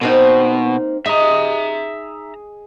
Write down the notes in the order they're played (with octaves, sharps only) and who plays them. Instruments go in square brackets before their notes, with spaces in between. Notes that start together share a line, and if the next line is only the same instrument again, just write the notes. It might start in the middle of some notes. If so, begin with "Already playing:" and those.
[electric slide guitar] B2 [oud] A#3 C4 D#4
[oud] D#4 [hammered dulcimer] G#4 D#5 [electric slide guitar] E5 A#5